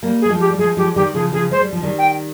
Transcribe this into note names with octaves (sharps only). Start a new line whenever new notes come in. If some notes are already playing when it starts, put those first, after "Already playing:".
G3 A#3
G#4
A#3
F3 G#3
G4
G3
F3 G#3 G#4
F3 G#3 G4
D#3 G3 G4
C#3 F3 G#4
C#3 F3 G#4
G#3 C5
G3
F3
D#3 G3
G5